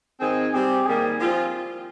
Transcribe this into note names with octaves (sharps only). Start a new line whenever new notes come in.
G#2 D#3 G#3 C4 G#4
C3 G3 C4 G4
G#2 D#3 G3 A#3 G#4
F3 C4 F4